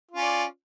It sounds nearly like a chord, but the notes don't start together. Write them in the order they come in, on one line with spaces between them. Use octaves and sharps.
F4 C#4 D5